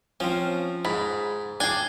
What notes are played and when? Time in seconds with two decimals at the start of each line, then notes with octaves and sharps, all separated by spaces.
0.20 F3 C4 C#4
0.85 G#2 B5
1.60 D4 G#4 G5 G#5